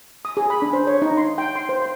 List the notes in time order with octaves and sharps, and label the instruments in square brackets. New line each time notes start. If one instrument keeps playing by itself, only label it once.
[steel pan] D#6
G#4
B5
D4
C5
C#5
D#4
C6
G5
C6
C5
C6